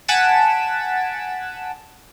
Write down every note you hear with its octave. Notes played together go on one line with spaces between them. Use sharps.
F#5 G#5 A5 B6 D7 E7